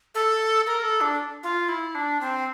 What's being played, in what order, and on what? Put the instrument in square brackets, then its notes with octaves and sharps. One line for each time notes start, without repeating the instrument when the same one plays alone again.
[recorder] A4
A#4
A4
D4
F4
E4
D4
C4